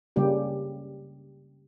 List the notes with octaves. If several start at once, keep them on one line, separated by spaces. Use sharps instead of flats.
C#3 G3 A#3 G4